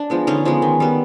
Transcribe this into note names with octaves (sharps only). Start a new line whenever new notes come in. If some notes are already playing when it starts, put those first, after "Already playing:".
Already playing: D4
F3 G#3 B3
D3 C#4 D#4
F3 G#3 B3
D#3
G3 B3